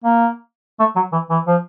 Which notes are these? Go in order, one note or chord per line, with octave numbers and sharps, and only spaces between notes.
A#3
A3
F#3
E3
E3
F3